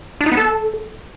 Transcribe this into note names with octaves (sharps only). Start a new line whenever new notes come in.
D4
D#4
B3
A4